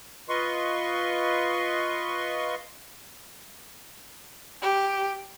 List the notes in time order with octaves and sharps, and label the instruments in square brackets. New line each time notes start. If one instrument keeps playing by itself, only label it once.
[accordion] F4 B4 D#5 C6 C#6
[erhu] G4